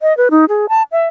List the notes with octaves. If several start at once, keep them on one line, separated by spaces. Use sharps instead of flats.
D#5
B4
D#4
G#4
A5
E5